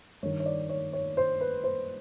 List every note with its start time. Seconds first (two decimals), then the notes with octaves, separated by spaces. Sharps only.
0.22 G2 C#5
0.26 D#3
0.40 C#5
0.46 D5
0.69 C#5
0.93 C#5
1.17 C5
1.41 B4
1.64 C5